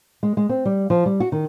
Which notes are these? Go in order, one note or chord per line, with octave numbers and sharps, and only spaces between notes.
G#3
G#3
C4
G3
F3
G3
F#4
D#3